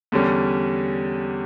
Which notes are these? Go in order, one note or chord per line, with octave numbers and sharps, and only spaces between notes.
E2 D3 G3 C#4